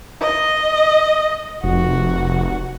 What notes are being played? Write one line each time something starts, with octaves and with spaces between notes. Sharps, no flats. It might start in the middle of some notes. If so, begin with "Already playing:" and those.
D#5
F1 F#4